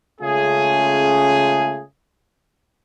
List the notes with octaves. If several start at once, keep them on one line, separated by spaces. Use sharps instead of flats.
C#3 G#3 A3 C#4 F4 G#4